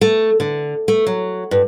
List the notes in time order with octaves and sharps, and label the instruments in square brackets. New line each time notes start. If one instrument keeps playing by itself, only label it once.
[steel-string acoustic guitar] A3
D3
A3
F#3
G2